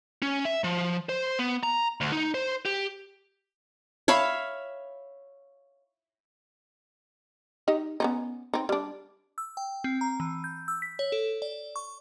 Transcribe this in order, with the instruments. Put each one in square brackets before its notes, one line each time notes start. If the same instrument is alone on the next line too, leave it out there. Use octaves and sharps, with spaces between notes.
[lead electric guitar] C#4
E5
F3
C5
B3
A#5
D2
D#4
C5
G4
[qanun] C#5 E5 F5 B5
[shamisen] D#4 G4 D#5
B3 C#4 D#4
C4 D#4
G3 D4
[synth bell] E6
G5
C4
A#5
E3
G6
E6
B6
C#5
A4
D5
C#6